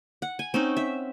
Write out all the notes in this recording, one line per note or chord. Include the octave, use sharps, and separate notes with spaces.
F#5
G#5
C4 C#4 D#4
E5